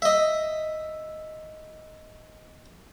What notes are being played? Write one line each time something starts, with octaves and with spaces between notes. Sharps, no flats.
D#5 E5